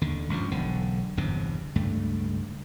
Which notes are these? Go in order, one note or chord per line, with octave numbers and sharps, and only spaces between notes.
D#2 D3
C#2 G2 F3
E1 B1 D3
G1 E2 G2 C3
C#2 G2 A3